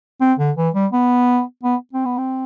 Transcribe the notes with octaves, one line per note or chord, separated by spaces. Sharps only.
C4
D3
E3
G3
B3
B3
C4
B3
C4